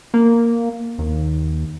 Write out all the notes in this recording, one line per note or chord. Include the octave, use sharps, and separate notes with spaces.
A#3
D#2